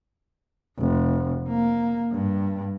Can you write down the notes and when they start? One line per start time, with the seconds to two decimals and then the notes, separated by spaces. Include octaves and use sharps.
0.79 F1
1.48 A#3
2.12 G2